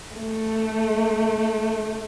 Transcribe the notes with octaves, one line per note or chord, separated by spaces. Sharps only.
A3